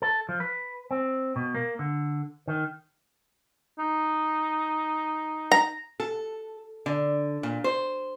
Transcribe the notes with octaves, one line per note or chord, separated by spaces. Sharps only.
A4
F3
B4
C4
B2
A#3
D3
D#3
D#4
A#5
A4
D3
A#2
C5